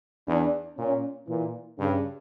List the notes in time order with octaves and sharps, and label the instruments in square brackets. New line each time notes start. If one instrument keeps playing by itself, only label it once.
[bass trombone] E2 [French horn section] D4
[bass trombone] A#2 [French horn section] C#4
[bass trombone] A#2 [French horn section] E3
[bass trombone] G2 [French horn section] C#3